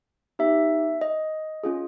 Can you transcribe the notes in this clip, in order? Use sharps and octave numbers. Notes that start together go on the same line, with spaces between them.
B3 D#4 G4 E5
D#5
C#4 F4 G#4